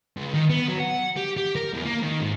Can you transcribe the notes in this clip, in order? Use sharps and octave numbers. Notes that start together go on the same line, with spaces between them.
C#2
D#3
B3
F#3
F#5
G4
G4
A#4
E2
A#3
D#3
G#2